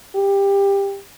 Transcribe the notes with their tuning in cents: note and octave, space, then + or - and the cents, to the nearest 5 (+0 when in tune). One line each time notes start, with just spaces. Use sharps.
G4 +20